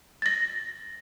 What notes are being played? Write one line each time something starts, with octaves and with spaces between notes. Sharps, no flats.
A6 A#6